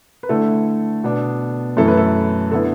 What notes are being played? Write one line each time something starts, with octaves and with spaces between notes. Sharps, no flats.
B4
D3 A3 E4 A4
B2 B3 D4
F#2 E3 A3 E4 A4
B4
A4
D3 B3 E4 A4